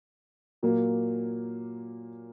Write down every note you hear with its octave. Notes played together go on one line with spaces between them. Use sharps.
A#2 F#3 A#3